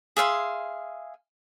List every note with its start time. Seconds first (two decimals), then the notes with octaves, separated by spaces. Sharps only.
0.17 G#4 E5 F5 C6